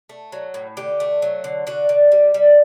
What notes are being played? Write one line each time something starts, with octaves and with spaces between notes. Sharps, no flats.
A3
F#3
A2
D3 G4
A3
F#3
D3
D3 F#4
D3
G3
G3